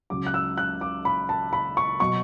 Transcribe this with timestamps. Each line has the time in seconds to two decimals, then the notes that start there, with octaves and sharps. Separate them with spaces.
0.10 C#2 C#3 F#3 D6
0.27 F#6
0.34 E6
0.58 F#6
0.81 D6
1.05 B5
1.29 A5
1.53 B5
1.77 C#6
2.00 B2 F#3 C#6